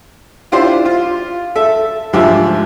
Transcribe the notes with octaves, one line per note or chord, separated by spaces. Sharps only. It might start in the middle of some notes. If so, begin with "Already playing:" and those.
D4 E4 F4 G4 C5
F4
A4 E5
D2 G#2 F3 G4 E5